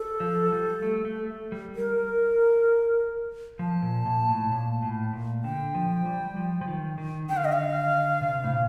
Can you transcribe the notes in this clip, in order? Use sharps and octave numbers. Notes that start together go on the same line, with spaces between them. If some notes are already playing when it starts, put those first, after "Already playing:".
Already playing: A4
F3
G3
A3
A3
G3
A#4
F3 A5
A#2
A#2
A2
A#2
A2
A#2
D3 G5
F3
G3
F3
F3
D#3
D#3
D3 G5
F5
D#5
F5
C3
A2
A#2